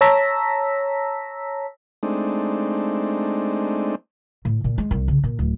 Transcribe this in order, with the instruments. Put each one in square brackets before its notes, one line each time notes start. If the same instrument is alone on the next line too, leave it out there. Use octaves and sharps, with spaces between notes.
[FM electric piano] C#5 A5 A#5 E6 A#6 B6
[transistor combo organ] G#3 A3 C4 D4 D#4
[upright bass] A2
A#2
G#3
C2
C#3
A#2
D1